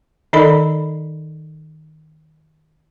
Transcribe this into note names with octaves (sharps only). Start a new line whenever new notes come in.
D#3 D#4 A4 D5 D#5 B5